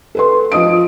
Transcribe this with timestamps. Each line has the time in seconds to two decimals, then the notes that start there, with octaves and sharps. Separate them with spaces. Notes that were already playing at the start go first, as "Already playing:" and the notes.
0.15 A4 B4 C6
0.52 F3 D#5 D#6 D7